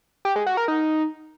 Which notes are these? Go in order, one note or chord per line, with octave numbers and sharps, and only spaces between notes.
G4
G#3
F#4
A#4
D#4